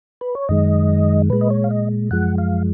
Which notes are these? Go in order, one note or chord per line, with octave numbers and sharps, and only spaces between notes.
B4
C#5
F#2 D#3 G#3 D#5
A#2 G#3 B4
D#5
C#5
F5
D#5
F#2 F3 G#3 F#5
F5